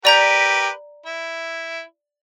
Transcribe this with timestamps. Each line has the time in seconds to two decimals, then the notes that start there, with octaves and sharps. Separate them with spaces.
0.05 G4 A#4 B4 D5 A#5 G6
1.06 E4